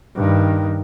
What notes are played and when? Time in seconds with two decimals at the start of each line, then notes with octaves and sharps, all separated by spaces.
0.15 G2 D#3